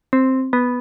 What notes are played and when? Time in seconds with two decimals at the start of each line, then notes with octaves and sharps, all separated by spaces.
0.13 C4
0.53 B3